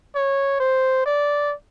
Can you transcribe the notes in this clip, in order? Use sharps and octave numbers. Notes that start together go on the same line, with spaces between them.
C#5
C5
D5